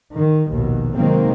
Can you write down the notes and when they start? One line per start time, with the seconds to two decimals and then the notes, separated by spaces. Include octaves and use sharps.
0.14 D#3
0.49 A#1 D#2 B2
0.97 C3 D#3 F#3 G#3 A#3 C4